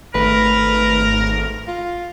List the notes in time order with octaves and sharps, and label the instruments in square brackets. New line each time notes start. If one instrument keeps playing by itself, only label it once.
[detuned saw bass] G#1 [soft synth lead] A3 [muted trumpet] A#4 [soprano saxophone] B4
[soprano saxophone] F4